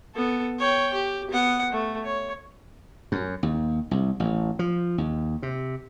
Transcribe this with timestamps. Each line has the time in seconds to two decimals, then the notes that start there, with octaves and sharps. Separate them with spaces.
0.15 B3 A4
0.59 C#5 G5
0.94 G4
1.31 B3 F#5
1.73 A3
2.04 C#5
3.12 F#2
3.43 D#2
3.91 C2
4.20 A1
4.59 F3
4.98 D#2
5.43 C3